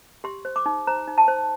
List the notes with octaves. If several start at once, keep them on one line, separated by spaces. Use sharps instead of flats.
G4 C6
C5
D6
D#4
C5 A#5
D#4
A5
C5